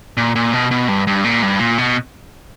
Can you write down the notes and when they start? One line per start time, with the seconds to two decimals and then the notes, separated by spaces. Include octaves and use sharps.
0.17 A#2
0.35 A#2
0.53 B2
0.71 B2
0.88 G2
1.07 G2
1.24 A#2
1.43 G2
1.59 A#2
1.78 B2